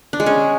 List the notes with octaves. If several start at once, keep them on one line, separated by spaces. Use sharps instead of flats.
D4
G#3
C#4